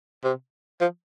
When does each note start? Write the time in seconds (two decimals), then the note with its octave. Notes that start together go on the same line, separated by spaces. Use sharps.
0.24 C3
0.81 F3